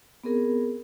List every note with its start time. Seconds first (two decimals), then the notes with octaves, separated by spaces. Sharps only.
0.24 B3 C4 G#4 A#4